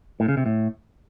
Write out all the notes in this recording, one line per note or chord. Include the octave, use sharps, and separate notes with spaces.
A2
C#3
C3
A2